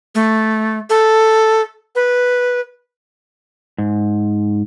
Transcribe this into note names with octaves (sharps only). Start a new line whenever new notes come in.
A3
A4
B4
G#2